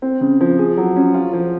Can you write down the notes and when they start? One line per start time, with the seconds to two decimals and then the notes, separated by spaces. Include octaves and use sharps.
0.02 C4
0.21 C#3
0.41 F3
0.59 G#4
0.77 F#3
0.96 C#4
1.14 F4
1.33 F3